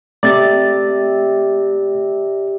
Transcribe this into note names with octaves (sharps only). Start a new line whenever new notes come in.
C3 A3 D5 A6